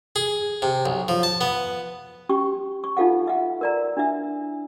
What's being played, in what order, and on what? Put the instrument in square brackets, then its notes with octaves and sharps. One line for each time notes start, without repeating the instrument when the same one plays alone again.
[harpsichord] G#4
C3
B1
F3
A5
B3
[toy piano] C#4 G4 C#6
C#6
D#4 F4 A4 F5 F#5
E5 F#5
A#4 D5 A#5
D4 E4 E5